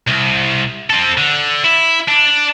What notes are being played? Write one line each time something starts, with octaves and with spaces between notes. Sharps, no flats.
C2
C4 A4
D3
E4
D4